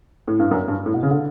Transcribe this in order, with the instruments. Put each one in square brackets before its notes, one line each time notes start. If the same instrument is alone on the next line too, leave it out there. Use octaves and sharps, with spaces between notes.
[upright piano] A2
G2
F#2
G2
A2
B2
C#3
D3